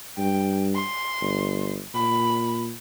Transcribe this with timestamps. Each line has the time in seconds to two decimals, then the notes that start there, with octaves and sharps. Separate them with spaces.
0.18 G2 G5
0.75 C6
1.22 G1
1.95 A#2 B5